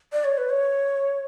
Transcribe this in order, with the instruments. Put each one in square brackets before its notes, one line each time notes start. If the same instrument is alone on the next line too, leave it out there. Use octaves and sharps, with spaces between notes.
[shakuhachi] D5
C#5
B4
C#5